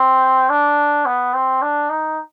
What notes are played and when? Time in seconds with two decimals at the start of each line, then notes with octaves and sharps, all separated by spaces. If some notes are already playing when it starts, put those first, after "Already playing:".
Already playing: C4
0.49 D4
1.06 B3
1.34 C4
1.62 D4
1.90 D#4